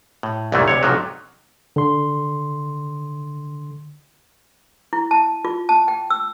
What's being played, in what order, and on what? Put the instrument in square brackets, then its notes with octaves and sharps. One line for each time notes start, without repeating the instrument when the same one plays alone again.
[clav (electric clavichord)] A2
C2 F#2 A#2 D#3 E3 A3
D2 C3 C#5
B1 G#2 C3 F3 F#3
[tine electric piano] D3 C6
[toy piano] E4
A5
F4
A5
G5
E6